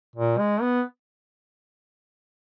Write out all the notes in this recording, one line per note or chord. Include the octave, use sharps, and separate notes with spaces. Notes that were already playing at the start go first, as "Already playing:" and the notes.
A#2
G#3
B3